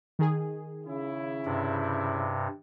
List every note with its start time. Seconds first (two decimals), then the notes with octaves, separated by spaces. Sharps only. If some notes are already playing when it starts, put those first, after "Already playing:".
0.19 D#3 G#4
0.87 C#3 E4
1.45 G2 C3